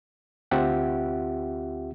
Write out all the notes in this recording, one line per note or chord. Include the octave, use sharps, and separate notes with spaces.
D2 C4 F4 G4 E5 F#5